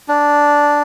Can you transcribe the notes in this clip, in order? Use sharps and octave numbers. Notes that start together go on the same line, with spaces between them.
D4